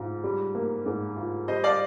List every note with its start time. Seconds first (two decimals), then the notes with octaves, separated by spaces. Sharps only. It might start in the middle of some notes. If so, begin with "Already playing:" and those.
Already playing: G#2 F4
0.24 G3
0.55 A#3
0.86 G#2
1.17 F4
1.48 G3 C5 D#5
1.64 D5 F5